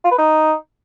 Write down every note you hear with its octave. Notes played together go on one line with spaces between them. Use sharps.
F4
B4
D#4